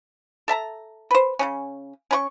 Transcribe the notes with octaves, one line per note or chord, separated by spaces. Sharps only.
A4 E5 A5 A#5
B4 C5
C#3 F#3 C#4
C#4 B4 C#6